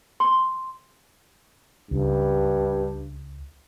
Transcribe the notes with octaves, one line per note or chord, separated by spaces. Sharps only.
C6
C#2 G2